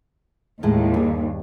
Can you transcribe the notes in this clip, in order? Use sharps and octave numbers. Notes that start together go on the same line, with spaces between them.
D#2 A2 G#3 A3
G2 G#4